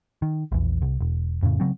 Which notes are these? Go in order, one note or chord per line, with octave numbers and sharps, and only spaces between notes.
D#3
A#1 E2
C2
E1
F2 A2 C#3
C#3 F#3 C4